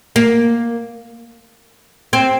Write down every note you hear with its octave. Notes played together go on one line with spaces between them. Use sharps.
A#3
C4